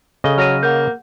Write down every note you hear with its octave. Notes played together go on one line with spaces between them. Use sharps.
C#3 A4 D#5 G7
F#3 F6 A#6 D#7
A#3 F#5 G6